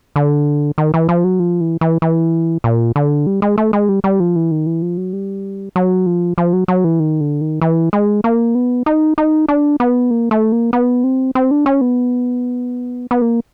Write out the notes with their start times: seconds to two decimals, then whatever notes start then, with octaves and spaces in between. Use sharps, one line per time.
0.16 D3
0.78 D#3
0.94 E3
1.09 F3
1.24 F#3
1.40 F3
1.61 E3
1.81 E3
2.02 E3
2.64 A#2
2.96 D3
3.26 G3
3.42 G#3
3.58 A3
3.73 G#3
3.89 G3
4.04 G3
4.20 F3
4.36 E3
4.51 D#3
4.66 E3
4.82 F3
4.97 F#3
5.13 G3
5.76 F#3
6.06 F3
6.38 F3
6.53 F#3
6.68 F#3
6.84 E3
7.00 D#3
7.20 D3
7.41 D#3
7.61 E3
7.93 G#3
8.24 A#3
8.55 B3
8.86 D#4
9.18 D#4
9.49 D4
9.80 B3
10.11 A#3
10.31 A3
10.52 A#3
10.73 B3
11.04 C4
11.35 C4
11.51 D4
11.66 C#4
11.81 B3
13.11 B3
13.22 A#3